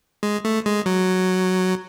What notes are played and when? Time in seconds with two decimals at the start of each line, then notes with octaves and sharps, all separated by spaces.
0.23 G#3
0.45 A3
0.66 G#3
0.86 F#3